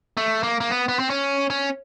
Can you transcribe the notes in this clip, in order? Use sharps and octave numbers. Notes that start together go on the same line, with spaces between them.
A3
A#3
A#3
B3
B3
C4
C#4
C#4